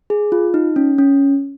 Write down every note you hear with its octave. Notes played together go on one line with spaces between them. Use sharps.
G#4
F4
D#4
C#4
C#4